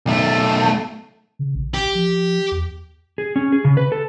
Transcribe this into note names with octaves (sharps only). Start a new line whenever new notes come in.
B1 A3
C#3
A#1
G4
F3
E2
G#4
C#4
G#4
C#3
B4
A4